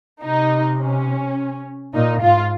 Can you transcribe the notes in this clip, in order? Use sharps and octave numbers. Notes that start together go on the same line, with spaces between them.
C3 D#4
C#4
A#2 D#4
G#2 F4